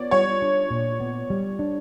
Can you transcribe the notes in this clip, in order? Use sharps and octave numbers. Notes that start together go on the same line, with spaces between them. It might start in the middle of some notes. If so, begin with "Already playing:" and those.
Already playing: B3 C#5 D5
G3 C#5
D4
A#2
B3
G3
D4